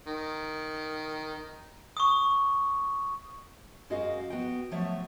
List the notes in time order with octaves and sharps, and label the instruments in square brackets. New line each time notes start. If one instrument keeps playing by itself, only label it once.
[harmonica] D#3
[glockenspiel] C#6 D#6
[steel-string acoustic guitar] F#2 G#3 F#4 G#4 D#5 F5
B3 F#4 G5
F3 F#3 A3 B3 C#5 E5